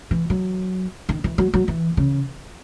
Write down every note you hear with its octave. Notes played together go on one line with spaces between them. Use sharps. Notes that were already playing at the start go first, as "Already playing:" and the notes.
E3
F#3
D#3
E3
F#3
F#3
E3
C#3